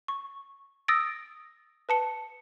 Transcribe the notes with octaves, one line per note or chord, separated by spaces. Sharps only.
C#6
D#6 E6 A6 A#6 D7
B4 A5 C#7